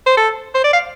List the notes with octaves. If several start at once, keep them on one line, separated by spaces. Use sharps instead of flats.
C5
A4
C5
D5
F5